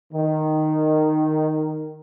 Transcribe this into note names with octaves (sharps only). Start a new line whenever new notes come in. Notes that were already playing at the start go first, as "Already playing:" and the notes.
D#3